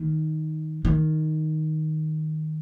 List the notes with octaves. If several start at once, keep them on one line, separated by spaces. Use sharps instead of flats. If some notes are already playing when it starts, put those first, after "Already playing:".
Already playing: D#3
D#3